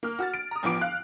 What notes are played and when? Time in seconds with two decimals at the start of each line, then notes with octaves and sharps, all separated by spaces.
0.03 A#3 F6
0.19 F#4 F6 A6
0.34 D7
0.51 A#5 D#6
0.63 A1 F3 B3 D6 D7
0.81 F5 F#6